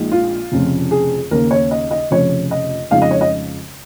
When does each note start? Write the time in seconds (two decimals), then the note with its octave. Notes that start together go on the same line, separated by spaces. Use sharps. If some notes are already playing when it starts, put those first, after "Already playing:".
Already playing: A#1 A#2 G#3 D#4
0.12 F4
0.52 F1 F2 C#3
0.91 G#4
1.31 D#2 C#3 A#3 A#4
1.51 C#5
1.71 D#5
1.91 D#5
2.11 F1 F2 C#3 C#5
2.51 D#5
2.91 F2 C#3 F3 G#3 D#4 F5
3.02 D#5
3.11 C#5
3.21 D#5